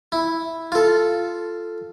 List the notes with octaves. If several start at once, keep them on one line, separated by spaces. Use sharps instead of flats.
E4
F4 A4